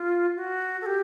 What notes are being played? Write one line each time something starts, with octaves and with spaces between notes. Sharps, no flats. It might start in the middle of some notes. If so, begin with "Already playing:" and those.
Already playing: F4
F#4
A4
G4